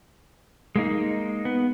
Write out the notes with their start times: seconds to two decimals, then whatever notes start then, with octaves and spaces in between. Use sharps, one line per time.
0.76 G#3 A#3 D#4
1.45 B3